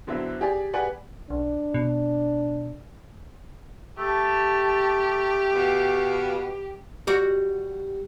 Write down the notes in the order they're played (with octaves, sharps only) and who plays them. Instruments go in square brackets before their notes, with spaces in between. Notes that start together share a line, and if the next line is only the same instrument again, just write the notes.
[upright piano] B2 D3 F#3 C4 E4
G4 G#4 D5
G4 G#4 B4 D5 F#5 G#5
[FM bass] B1 [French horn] D4
[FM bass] B2
[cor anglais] A3 [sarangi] G4 [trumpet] A5
[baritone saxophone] B2 [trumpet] F5
[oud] G3 F#4